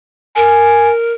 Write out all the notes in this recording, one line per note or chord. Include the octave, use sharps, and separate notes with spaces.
A#4 G#5